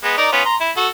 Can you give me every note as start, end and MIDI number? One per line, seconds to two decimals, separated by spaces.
0.03 0.13 56
0.03 0.13 59
0.18 0.29 63
0.18 0.29 70
0.18 0.29 74
0.32 0.42 59
0.32 0.42 61
0.32 0.42 65
0.45 0.55 82
0.45 0.55 84
0.60 0.71 64
0.77 0.88 66
0.77 0.88 69